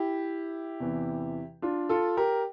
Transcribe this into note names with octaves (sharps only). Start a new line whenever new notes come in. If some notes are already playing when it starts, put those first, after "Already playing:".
Already playing: E4 G4
E2 C3 E3
D4 F4
F4 A4
G4 A#4